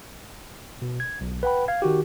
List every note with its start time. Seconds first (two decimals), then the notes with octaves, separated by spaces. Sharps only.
0.82 B2
1.00 G#6
1.21 B1
1.43 B4 F#5 G5 B5
1.68 F5 G#6
1.82 D#3 F#4 G4